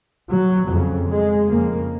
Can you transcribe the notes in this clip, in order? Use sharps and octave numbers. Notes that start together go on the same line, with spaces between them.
F#3
F2 C#3
G#3
F2 C#3 A#3